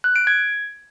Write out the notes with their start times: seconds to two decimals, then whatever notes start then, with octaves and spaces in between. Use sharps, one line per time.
0.04 F#6
0.16 D7
0.27 G#6